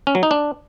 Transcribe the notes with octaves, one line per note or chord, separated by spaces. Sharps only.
C#4
F#3
D#4
D4